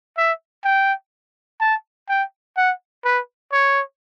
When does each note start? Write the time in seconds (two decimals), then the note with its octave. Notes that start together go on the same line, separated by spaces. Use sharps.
0.18 E5
0.65 G5
1.61 A5
2.09 G5
2.57 F#5
3.05 B4
3.52 C#5